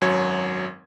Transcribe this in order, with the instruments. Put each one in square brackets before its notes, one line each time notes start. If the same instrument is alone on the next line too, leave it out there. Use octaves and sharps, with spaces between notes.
[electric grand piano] G#1 F#2 F#3 C#5 G#6